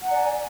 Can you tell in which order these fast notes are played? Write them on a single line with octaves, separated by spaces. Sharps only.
F#5 A#5 D5 G#5